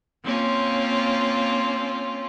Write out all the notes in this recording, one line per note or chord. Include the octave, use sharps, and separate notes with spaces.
A#3 C4 C#4 F4